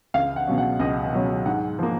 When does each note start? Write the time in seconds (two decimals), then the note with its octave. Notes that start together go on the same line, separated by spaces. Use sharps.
0.14 C#2 F5
0.36 F#5
0.47 B2 F#3 C#4
0.58 F#5
0.80 C#2 D#5
1.13 B2 F#3 C#4
1.46 G#2 F#5
1.79 F3 A#3